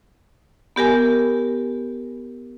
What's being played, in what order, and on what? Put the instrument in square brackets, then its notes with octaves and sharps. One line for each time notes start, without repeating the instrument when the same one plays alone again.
[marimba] B3 G4 A#4 G#5